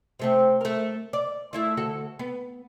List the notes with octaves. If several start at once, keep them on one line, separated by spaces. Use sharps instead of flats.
C3 A3 C4
A3 A#4
D5
A3 E4 F4
D2 F#4 A4
B3